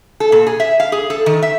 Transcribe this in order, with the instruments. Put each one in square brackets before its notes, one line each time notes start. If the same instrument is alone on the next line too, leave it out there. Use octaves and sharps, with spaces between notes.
[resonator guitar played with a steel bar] A4
A#2
G#4
E5
F5
G#4
A4
D#3
E5